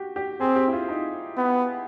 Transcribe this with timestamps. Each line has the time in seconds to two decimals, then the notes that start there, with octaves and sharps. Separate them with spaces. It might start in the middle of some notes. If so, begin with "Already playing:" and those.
Already playing: F#4 G4
0.16 G4
0.40 C4 G#4
0.56 G4
0.68 E4
0.73 F4
0.89 D#4
1.37 B3